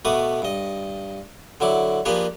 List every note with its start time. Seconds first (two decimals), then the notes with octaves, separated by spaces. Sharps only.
0.05 B2 A3 B4 D6 D#6
0.42 G2 D#5
1.60 D3 F#3 E4 D6
2.05 F3 A#3 D4 G4 G#4 B4